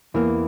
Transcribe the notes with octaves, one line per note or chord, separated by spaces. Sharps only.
E2 E3 A#3